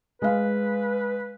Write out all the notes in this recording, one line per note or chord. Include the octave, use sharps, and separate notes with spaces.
G#3 B4 F5